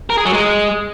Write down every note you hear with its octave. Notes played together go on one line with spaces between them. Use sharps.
A#4
G#4
F#3
G#3